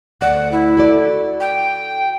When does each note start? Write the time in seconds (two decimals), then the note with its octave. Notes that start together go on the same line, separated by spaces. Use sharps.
0.21 D2 D5 F#5
0.52 E4
0.77 F#4 A4 D5
1.40 G5